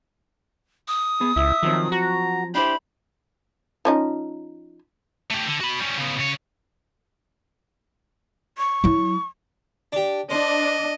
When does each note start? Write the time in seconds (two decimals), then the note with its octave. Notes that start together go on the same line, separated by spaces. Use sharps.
0.88 D#6
1.21 B3 G#4
1.36 C#2 E4 E5
1.63 D#3 F3 F#3 C4
1.92 F#4 A#5
2.55 D4 E4 G4 C5 B5
3.85 F3 C#4 D#4
5.30 A3 G4
5.47 D3
5.60 F#4 B5
5.79 G3 C#4
5.98 C#3 B3
6.19 C#3 C#5
8.58 C#6
8.84 F#3 E4
9.93 D4 G4
10.30 D4 C5 D#5